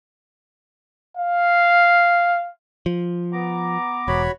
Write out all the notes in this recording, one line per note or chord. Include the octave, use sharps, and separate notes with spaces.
F5
F3
B3 A#5 D6
E1 F#4 C#5 B5